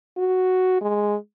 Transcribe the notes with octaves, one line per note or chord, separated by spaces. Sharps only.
F#4
G#3